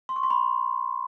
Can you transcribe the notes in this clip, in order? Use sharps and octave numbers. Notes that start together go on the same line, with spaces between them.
C6
C#6
C6
B5